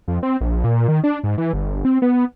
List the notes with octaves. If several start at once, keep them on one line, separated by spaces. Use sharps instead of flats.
F2
C4
A#1
A#2
D#3
D4
G#2
E3
G1
C4
B3